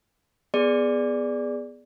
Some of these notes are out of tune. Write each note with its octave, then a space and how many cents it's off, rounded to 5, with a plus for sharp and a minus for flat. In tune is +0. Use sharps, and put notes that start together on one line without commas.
B3 +0 G#4 +0 D5 +0